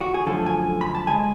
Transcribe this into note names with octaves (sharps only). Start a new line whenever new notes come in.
F#4
G#4
F#2 D3 F3 A3 A4
G#5
B5
A5
C#3 G#3 G#5